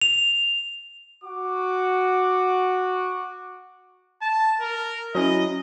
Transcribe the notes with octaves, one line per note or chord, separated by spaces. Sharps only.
F7
F#4 D6
A5
A#4
F#3 C#4 E4 D#5